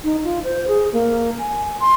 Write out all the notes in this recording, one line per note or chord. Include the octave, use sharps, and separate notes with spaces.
D#4
F4
C5
G#4
A#3
G#5
C6